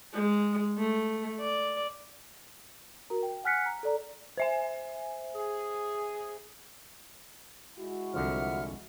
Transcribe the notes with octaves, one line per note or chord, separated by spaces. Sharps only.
G#3
A3
D5
F#4 A#4 A#5
G5
F#5 G#5 F6 F#6 B6 C#7
A#5
A4 D5 A#5
C5 E5 G#5
G#4
G#3 E4 F#4
C2 D3 F3 E5 F#5 F6